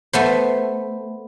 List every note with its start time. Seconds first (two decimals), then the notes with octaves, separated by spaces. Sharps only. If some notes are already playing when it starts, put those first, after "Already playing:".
0.13 A3 B3 C5